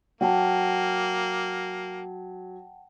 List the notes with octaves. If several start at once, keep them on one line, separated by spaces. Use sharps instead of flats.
F#3 A#3 F#5 G5 A5